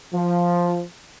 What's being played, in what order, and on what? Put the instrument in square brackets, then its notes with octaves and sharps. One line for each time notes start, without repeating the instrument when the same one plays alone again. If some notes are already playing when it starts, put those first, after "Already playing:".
[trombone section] F3